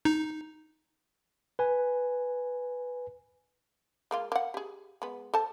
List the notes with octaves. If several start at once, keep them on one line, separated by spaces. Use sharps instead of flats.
D#4
B4 G#5
G#3 A#3 F4
A#3 F#5
G4 G#4
G#3 B3
A4 C5 A5